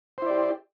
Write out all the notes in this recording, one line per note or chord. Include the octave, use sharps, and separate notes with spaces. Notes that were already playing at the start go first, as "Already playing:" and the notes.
E4 G4 C5 D5